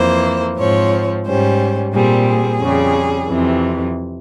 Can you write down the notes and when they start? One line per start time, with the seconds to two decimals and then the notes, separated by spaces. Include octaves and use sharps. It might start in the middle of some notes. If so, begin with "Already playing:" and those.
Already playing: F2 E3 A#3 C5
0.57 G#2 F3 C4 C#5
1.26 G#2 G3 C#4 C5
1.93 A#2 G3 C4 G#4
2.27 G#4
2.61 F2 C#3 G3
3.28 F2 C3 E3